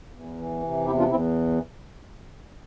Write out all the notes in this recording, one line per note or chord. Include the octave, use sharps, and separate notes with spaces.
E2
E3
C3
E2 E4 G4
D4 F4
E2 C4 E4